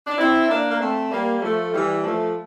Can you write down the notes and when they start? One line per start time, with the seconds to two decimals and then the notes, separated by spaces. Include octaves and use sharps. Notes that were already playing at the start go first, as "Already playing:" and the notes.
0.07 D4
0.17 C4 E4
0.49 A#3 D4
0.70 A#3
0.79 A3 C4
1.11 G3 A#3
1.38 A#3
1.42 F3 A3
1.73 E3 G3
2.04 F3 A3